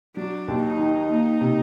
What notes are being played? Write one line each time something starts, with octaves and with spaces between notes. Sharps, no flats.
F#3 D4
D#2
D#4
D#3
A#3
C3